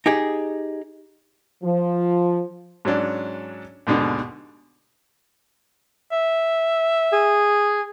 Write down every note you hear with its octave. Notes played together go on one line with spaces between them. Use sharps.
D#4 G4 G#4
F3
G#2 F#3 C#4 D4
D#2 G#2 B2 D3
E5
G#4